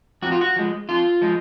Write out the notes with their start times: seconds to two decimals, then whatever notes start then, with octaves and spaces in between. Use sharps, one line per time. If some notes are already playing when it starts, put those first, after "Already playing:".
0.22 F2 F#4
0.32 F4
0.41 F#4
0.56 F3 G#3
0.89 F2 F4
1.21 F3 G#3